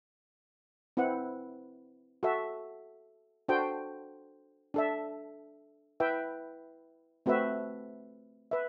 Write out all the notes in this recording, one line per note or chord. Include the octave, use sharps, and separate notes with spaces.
C4 E4 B4 F#5
F#4 A4 E5
D4 F#4 A4 C5 G5
D4 A4 E5
E4 B4 E5 G5
A3 C4 F#4 B4 E5
B4 E5